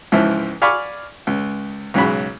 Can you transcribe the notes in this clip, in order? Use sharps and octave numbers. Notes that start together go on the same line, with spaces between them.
C#2 G#2 E3 F3 E4
D5 F5 G#5 B5 C#6 D6
C#2
B1 G#2 C#3 F#3 B5